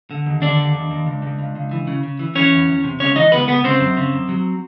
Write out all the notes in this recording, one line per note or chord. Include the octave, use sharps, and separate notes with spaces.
D3
D#2
D3 D4 D5
D#2
D#2
D#2
C#2
C#2
C#2
C#2
E3
C#3
C#3
E3
E3 C#4 C#5
E2
E2
C3
C#2 C#4 C#5
E3 D#4 D#5
C#2 B3 B4
C#2 B3 B4
C#3 C4 C5
F#2
C#3
F#2
F#3